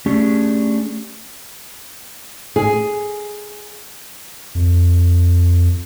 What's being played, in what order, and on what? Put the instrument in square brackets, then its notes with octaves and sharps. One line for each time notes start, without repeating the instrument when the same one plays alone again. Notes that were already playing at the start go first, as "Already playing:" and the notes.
[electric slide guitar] A3 C#4 D4 G4 G#4
[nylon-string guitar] G#4
[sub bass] F2